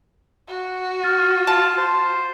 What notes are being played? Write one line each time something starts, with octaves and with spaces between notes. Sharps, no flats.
F#4
F6 A6
F4 A5
C5